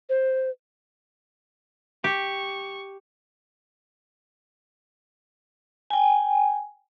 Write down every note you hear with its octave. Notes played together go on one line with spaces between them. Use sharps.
C5
G4 C#6
G5 G#5